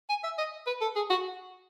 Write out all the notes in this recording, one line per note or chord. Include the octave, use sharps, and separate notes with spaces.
G#5
E5
D#5
B4
A4
G#4
F#4